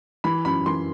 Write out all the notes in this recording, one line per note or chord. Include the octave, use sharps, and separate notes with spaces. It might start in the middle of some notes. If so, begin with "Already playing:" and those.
E3 B5
F#2 B5
E3 C6